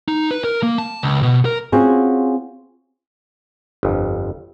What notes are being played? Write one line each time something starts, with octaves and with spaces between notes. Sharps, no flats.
D#4
B4
A#4
A#3
A5
C#2
B2
A#4
C4 C#4 F4 F#4 G#4
G1 F2